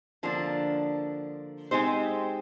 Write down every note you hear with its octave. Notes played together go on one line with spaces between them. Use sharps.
D3 F3 A#3 D4
G#3 C4 D#4 G4 C5